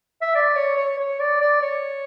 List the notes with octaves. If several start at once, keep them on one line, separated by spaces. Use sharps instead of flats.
E5
D5
C#5
C#5
C#5
D5
D5
C#5